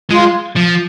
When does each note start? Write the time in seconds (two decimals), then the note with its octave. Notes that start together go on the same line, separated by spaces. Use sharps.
0.10 G#3 F4
0.56 F3